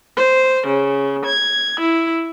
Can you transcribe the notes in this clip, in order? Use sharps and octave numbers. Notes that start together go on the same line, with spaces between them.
C5
C#3
G#6
E4